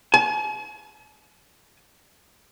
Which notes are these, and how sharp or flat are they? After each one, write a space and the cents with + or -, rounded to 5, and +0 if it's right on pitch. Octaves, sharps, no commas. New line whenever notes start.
G#5 +45